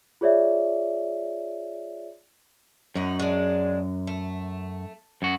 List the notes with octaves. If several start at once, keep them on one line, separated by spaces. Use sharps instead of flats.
F4 G#4 C#5 D5 E5
F#2 D#4 F#4
G#3 D4
A3
F#2 F#4